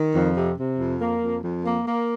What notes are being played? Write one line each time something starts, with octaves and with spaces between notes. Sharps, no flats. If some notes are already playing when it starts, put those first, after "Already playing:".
Already playing: D#3
F2
C3
C3
F2
A#3
F2
F2
A#3
A#3